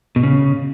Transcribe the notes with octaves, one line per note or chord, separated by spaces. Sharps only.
B2
C#3